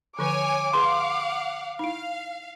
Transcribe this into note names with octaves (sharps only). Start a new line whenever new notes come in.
D3 F3 B4 C#5 G#5 D6
G#4 B4 F5 F#5 C6
D#4 E4 F5